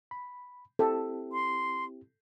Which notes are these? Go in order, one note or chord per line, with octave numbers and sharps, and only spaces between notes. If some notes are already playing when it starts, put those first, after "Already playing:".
B5
C4 E4 G4 A4
C6